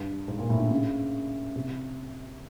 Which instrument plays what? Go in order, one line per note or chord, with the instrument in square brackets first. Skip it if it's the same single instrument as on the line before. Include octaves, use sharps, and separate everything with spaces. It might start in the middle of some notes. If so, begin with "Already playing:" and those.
Already playing: [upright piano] G2
G#2
A#2
A2
D3
C#3
C3